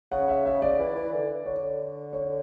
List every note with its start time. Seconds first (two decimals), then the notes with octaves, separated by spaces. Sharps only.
0.12 C#3 F#5
0.28 E5
0.45 C#3 E5
0.62 D5
0.79 E3
0.96 E3
1.12 D3
1.46 D3 C#5
2.13 C#5